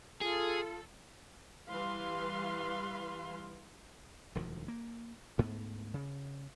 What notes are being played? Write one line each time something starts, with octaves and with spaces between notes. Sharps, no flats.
F4 G#4 A4
E3 G3 B4 F5 C6
E1 D2 D#3 F3
A#3
D2 G#2 A3 B3
C#3